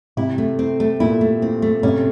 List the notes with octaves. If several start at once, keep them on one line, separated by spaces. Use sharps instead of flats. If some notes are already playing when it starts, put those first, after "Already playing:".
C3 E4
A3
C4
A3
A#2 E4
A3
C4
A3
C3 C#4